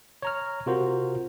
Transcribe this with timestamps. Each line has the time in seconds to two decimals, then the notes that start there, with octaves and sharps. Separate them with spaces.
0.22 C#5 A#5 F6
0.66 C3 F4 F#4 A#4 C5